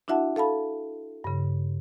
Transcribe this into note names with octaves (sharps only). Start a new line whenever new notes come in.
D4 E4 F#4 E5 F#5 A5
A4 F5 A5 B5
G2 C#3